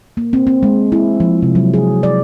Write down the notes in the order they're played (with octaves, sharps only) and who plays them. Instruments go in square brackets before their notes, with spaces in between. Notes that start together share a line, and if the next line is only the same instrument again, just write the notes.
[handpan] A#3
C4
C4
G#3
E4
F3
C3
F#3
G#4
D5